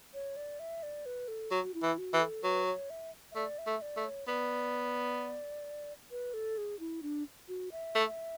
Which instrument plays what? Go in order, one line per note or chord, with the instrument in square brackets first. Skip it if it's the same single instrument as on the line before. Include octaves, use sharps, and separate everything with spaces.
[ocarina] C#5
D5
E5
D5
B4
A4
[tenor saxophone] F#3 [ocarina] F#4
[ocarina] E4
[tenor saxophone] E3
[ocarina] F#4
[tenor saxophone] E3
[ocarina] A4
[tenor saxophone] F#3 [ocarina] B4
[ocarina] C#5
E5
E5
[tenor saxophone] A3 [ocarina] D5
[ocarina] E5
[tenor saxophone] A3
[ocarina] D5
[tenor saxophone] A3
[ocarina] C#5
[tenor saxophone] B3 [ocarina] D5
[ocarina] B4
A4
G#4
E4
D4
F#4
E5
[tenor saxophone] A3